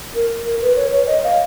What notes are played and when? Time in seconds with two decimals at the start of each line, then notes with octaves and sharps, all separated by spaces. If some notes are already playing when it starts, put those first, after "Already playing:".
0.15 A#4
0.45 A#4
0.62 B4
0.76 C#5
0.92 C#5
1.07 D#5
1.24 F5